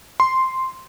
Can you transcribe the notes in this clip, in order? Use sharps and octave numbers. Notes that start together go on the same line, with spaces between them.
C6